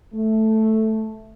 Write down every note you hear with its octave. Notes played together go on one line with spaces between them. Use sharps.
A3